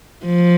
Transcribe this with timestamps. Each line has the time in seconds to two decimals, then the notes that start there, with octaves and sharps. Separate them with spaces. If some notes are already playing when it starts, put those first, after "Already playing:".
0.25 F3